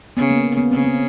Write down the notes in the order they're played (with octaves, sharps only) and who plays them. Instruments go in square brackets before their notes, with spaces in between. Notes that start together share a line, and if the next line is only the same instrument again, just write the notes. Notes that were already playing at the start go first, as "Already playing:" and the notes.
[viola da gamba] C#3 [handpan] B3
[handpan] A#3
B3
[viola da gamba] C#3 [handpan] C4
[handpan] C#4